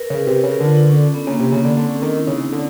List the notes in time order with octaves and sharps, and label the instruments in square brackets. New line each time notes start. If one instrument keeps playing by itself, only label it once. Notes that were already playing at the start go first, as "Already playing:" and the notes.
Already playing: [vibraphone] A#4 B4
[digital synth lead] C#3 [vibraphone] B4
[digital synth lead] C3 [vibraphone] B4
[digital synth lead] C#3 [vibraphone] B4
[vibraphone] A#4
[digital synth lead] D3 [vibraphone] F4
[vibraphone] D4
C#4
B3
[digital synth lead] C#3 [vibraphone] A#3
[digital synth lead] C3
[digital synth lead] C#3 [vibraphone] B3
[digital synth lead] D3
[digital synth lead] D3 [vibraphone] C4
[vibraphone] C#4
[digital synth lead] D#3 [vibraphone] D4
[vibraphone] E4
[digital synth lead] C#3 [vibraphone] D#4
[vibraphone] D4
[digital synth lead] D3